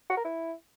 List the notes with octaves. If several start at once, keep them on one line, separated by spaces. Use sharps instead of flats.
F#4
A#4
E4